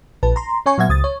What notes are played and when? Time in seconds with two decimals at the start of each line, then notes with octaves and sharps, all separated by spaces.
0.23 A#1 B4 A5
0.36 A#5 C6
0.66 C#4 C#5 G#5 C#6
0.78 A#2 F#3 B3 E5 F#5 G#6
0.89 C#2 D#6 A6
1.04 C#5